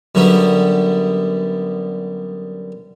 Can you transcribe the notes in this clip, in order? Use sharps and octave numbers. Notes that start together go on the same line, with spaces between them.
F#2 D3 G3 B3